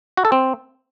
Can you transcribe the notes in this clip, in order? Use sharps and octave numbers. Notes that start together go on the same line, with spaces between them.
F#4
A4
C4